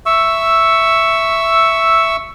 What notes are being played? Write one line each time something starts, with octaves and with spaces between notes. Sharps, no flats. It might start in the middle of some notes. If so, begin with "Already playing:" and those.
E5 C#6 E6